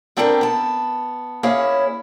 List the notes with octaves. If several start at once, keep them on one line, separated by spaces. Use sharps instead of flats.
B3 C4 D4 G4 A4 A#4
B3 A5
A#3 C#4 E4 G#4 C#5